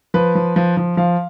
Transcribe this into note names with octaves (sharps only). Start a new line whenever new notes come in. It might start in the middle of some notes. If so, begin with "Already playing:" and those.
F3 B4
F3
F3
F3
F3 F5